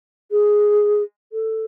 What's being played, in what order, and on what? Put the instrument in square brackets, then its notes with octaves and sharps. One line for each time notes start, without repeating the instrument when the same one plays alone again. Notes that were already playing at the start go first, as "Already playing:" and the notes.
[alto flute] G#4
A4